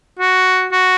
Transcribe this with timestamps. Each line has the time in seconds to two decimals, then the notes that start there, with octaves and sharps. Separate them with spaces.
0.19 F#4
0.72 F#4